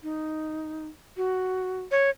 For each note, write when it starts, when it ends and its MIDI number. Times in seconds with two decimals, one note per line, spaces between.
0.03 0.87 63
1.17 1.80 66
1.92 2.10 73